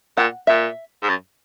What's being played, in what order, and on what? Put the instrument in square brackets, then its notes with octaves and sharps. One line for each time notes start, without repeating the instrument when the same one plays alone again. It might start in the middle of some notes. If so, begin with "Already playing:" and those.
[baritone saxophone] A#2 [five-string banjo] F#5
[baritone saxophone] A#2 [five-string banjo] E5
[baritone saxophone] G#2
F#2